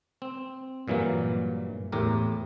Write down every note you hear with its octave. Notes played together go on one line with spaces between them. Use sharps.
C4
G2 A#2 E3 F#3 A#3
E2 A2 G4 A#4